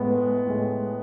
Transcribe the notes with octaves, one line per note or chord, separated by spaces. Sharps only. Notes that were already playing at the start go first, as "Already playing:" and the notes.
Already playing: A2 G#3 B3
A2 G#3